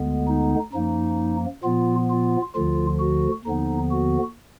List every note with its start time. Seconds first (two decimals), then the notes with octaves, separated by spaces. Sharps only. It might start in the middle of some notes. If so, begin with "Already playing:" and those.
Already playing: D2 D3 G#3 B3
0.28 D#4
0.73 F#2 F3 A#3 D#4
1.64 A#2 F3 B3 F4
2.10 F4
2.55 D2 D3 F3 F4
3.00 F#4
3.45 D#2 D3 F3 B3 D#4
3.91 F#4